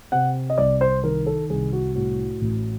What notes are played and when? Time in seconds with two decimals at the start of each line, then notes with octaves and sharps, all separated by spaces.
0.12 C3 F#5
0.50 D#5
0.58 C2 D5
0.81 C5
1.04 D#3 A#4
1.26 A4
1.50 C2 G#4
1.73 F#4
1.95 A2 F#4
2.42 A1